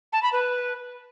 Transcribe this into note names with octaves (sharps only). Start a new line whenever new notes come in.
A5
B5
B4